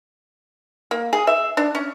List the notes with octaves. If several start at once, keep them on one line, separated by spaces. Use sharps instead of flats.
A#3
G#4
E5
D4
C#4